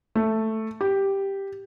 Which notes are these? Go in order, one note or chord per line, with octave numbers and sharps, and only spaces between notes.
A3
G4